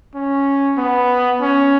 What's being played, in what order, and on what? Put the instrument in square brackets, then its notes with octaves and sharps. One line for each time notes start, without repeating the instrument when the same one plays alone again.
[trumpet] C#4
B3
C#4